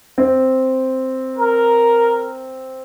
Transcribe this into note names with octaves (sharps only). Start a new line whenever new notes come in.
C4
A#4